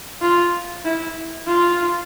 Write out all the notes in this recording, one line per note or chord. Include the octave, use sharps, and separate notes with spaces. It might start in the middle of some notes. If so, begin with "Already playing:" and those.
F4
E4
F4